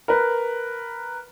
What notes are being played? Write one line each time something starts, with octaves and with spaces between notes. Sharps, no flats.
A#4 B4